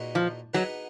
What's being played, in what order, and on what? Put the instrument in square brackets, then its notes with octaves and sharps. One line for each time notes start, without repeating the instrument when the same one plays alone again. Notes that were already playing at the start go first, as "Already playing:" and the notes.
Already playing: [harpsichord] A#2 G#3 D#4 F#4 B4
[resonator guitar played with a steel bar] F3
[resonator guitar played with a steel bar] F#3 [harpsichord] B3 D#4 G#4 B4